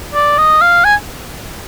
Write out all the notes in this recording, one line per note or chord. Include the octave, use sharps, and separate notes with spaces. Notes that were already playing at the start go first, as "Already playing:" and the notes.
D5
D#5
F5
G#5